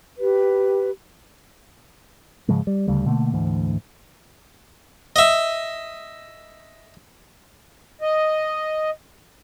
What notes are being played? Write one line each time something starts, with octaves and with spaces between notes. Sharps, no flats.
G4 B4
G#2 C#3 F3 G#3
G3
D2 C#3 G3
B2 D3 A3 A#3
D2 G#2 E3
D#5 E5
D#5